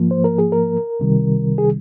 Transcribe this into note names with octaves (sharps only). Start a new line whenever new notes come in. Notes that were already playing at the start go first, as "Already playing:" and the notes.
Already playing: G#2 F3 A#3
C5
A#4
G#4
A#4
C2 C3 D#3 G3
G#4